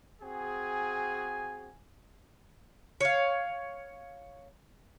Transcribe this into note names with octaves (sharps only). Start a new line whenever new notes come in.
C4 F#4 G#4 G#5
C#5 F5